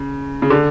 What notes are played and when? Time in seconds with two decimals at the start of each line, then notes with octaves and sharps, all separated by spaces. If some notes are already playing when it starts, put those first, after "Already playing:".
Already playing: C#3
0.42 C#3
0.50 D3